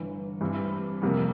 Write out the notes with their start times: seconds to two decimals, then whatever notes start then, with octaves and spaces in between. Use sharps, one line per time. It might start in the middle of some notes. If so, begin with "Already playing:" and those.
Already playing: G1 G2 E3
0.41 G2 E3 G3 C4 E4
1.02 F2 C3 G3 A#3